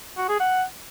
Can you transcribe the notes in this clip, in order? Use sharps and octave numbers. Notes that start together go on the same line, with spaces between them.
F#4
G#4
F#5